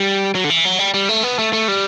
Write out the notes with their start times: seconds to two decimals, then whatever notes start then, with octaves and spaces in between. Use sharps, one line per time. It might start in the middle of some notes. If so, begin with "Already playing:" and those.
Already playing: G3
0.35 F#3
0.44 D3
0.50 E3
0.65 F#3
0.79 G3
0.94 G3
1.09 A3
1.23 B3
1.39 A3
1.53 A3
1.68 G3